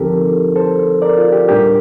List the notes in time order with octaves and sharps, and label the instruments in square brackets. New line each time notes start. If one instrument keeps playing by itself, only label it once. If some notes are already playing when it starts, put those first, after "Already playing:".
Already playing: [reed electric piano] D2 D3 F3 C4 D#4 G4 A4 A#4
A4 C5
A#4 D5
F4
G4
A2 G3 D4 G4 A#4